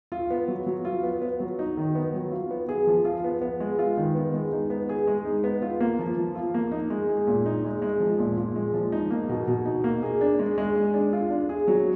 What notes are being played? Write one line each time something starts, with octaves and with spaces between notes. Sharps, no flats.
F4
B3
F#3
F#3
F4
B3
B3
F#3
D#4
D#3
B3
F#3
F4
B3
G#4
F3
F4
B3
B3
G#3
F4
D#3
B3
G#3
D#4
B3
G#4
G#3
D#4
B3
F4
A#3
F3
F3
F4
A#3
D#4
G#3
G#4
A#2
D#4
G#3
G#3
F3
A#2
A#2
G#3
F3
D#4
A#3
B2
B2
D#4
A#3
G#4
D4
G#3
G#3
G#4
D4
F4
D4
G#4
F#3